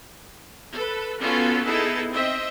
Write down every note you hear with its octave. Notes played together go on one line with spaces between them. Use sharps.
A4 B4
B3 C#4 F4 F#4 A4
B3 D#4 E4 G#4 A4
C4 D#5 E5